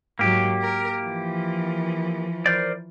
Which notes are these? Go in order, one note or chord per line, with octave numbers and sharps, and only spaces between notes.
G#2 F#3 A#3 G4
A#4
E3 F3
A#4 C5 D5